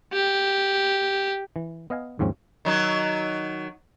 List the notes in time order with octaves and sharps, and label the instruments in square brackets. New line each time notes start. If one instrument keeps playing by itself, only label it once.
[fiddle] G4
[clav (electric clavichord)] E3
B3 D#5 F5 G#5
D#2 G#2 F3 C4 C#4
[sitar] D#3 F#3 D#4